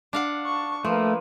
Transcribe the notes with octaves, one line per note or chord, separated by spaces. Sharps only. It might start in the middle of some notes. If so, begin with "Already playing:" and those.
D4 F5 F#5
A5 C#6
F3 A3 A#3 B4